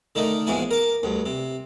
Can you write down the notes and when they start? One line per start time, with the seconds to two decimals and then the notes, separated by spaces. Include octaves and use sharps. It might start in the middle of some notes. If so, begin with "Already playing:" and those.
0.15 D3 D#3 A3 D#4
0.47 A#1 E2 G#2 E3 E4 G#5
0.71 A#4 D6
1.03 D2 G2
1.26 C3